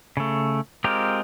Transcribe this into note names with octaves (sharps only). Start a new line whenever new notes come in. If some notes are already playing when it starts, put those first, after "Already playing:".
C#3 A3
G#3 C4 F4 G4 A#4